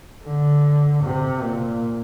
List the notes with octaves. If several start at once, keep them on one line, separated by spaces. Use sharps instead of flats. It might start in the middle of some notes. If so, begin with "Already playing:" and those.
D3
C3
A#2